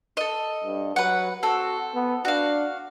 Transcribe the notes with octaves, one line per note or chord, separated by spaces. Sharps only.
A4 D#5
G2
F#3 B4 F#5
C4 F#4 A4
B3
D4 F#4 F5